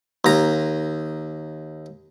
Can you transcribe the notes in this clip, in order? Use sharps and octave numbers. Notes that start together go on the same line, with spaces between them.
D#2 A#5